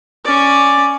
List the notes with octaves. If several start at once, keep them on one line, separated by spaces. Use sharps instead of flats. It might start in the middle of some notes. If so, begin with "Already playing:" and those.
C#4 D5